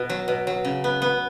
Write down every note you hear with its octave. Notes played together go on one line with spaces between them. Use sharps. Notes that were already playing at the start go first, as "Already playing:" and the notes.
Already playing: B2 B3
F#3
B2
F#3
C#3
B3
B3